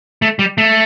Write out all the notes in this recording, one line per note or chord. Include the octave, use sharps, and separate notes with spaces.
A3
G3
A3